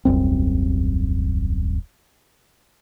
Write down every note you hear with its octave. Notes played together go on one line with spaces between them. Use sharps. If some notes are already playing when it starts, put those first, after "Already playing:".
D#1 C2 F#2 C4